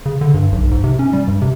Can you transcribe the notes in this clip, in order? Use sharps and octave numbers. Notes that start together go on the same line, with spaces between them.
C#3
D3
G2
B1
G#2
C3
C#4
G3
G2
C3